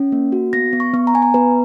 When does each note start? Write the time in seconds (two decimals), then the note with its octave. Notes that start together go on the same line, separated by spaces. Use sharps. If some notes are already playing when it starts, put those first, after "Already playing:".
Already playing: C#4
0.12 A#3
0.32 F#4
0.53 B3 A#6
0.73 B3
0.80 C#6
0.94 B3
1.07 A#5
1.14 B3 G#5
1.22 A#5
1.34 B3 B4